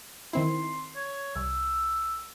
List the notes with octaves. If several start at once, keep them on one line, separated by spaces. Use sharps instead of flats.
D#3 C4 E4 C6
C#5
C2 E6